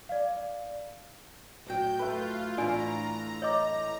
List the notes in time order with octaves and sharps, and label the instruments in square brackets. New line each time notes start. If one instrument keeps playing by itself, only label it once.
[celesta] D5 F5
[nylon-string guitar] A2 F#3 G5 [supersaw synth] G6
[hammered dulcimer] A3 B4 [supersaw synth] F4
[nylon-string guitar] A2 E3 [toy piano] D4 D5 G#5 [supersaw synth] A#5
[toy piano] C#5 D#5 D6